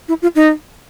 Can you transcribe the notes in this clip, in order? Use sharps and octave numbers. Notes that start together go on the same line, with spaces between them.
E4
F4
D#4